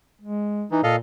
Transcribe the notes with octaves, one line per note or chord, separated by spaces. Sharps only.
G#3
E3 D#4
A#2 A4 D#5 F5